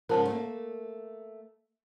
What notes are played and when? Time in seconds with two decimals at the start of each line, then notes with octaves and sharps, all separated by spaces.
0.09 G#2 C#3 F3 A#4 A5
0.28 A3 A#3